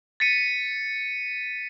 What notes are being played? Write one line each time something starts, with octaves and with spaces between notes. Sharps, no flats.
A6 B6 C#7 D#7